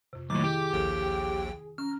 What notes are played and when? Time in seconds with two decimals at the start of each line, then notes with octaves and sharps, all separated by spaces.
0.13 F2 C3
0.30 B1 A2 D#3 D6
0.44 E4 G4 G#4
0.73 A#1 D#2 A4 G5
1.78 C#4 A#5 F6